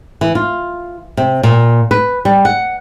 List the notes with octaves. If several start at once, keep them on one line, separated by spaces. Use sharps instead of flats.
E3
F4
C3
A#2
B4
G3
F#5